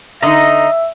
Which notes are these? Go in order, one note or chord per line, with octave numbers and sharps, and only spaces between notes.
D3 D#4 D#5 E5 A#5